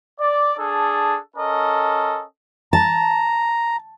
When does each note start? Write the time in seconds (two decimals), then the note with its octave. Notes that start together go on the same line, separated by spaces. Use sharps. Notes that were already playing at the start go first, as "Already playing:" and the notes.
0.20 D5
0.58 D4 G#4 A4
1.37 C#4 A4 A#4 D#5
2.73 A5 A#5